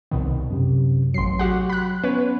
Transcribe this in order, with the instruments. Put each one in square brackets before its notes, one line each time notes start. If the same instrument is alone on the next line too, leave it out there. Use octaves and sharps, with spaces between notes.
[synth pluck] C2 B2 D#3
[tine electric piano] F#2 C3
[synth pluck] A1 C7 [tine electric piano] F#3 C6
[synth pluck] F#4 G4 F#5
B5 F#6
[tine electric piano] B3 C#4 [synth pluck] B4 C#5